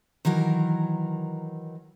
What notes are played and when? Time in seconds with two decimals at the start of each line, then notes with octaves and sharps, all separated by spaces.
0.25 D#3 E3 F#3 A#4